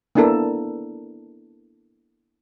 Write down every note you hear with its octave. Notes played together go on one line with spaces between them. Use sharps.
A#3 B3 D4 E4 A4 A#4